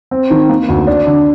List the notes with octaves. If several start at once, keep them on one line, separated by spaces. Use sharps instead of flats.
C4
D#3
A#3
D2
D4
D3